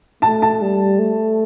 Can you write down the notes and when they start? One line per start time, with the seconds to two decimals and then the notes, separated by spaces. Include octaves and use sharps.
0.22 A3 A5
0.42 A5
0.62 G3
0.99 A3